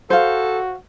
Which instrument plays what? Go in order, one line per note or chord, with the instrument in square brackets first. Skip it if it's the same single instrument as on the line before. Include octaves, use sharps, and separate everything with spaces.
[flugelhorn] F#4 [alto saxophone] A4 [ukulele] C5 F5